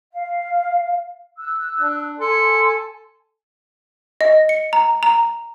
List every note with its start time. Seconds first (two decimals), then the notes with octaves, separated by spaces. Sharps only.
0.13 F5
1.38 E6 F#6
1.81 D4
2.20 A4 G#5 C6
4.21 D#5
4.49 C#7
4.73 A#5
5.03 A#5